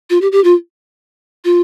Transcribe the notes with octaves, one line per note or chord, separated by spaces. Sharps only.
F4
G4
G4
F4
F4